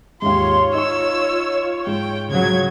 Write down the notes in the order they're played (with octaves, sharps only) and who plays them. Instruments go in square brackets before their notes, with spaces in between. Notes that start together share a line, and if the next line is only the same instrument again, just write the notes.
[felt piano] D#2 G#2 [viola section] F4 C#5 [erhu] C6
[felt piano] D#4 C#6 [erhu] E6
[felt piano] G#2 [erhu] G5
[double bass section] C#3 F#3 [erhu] G#6